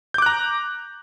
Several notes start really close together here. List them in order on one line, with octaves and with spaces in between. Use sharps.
G6 D6 F#6 A#5